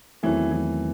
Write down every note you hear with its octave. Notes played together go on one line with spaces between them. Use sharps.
E2 D#3 E3 F#3 A3 C4
E3